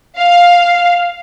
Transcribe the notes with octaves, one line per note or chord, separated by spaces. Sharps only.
F5